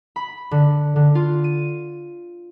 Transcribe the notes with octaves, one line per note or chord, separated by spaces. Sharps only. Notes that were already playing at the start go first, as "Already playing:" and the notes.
B5
D3
D3
F4
D#7